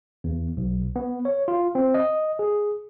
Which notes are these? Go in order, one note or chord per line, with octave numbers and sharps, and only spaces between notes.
E2
B1
B3
C#5
F4
C4
D#5
G#4